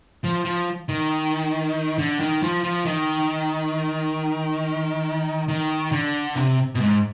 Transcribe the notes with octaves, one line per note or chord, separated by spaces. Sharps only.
F3
F3
D#3
D3
D#3
F3
F3
D#3
D#3
D3
C3
B2
G#2